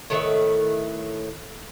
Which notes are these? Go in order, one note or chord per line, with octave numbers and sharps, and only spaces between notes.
A2 D#3 B4 E5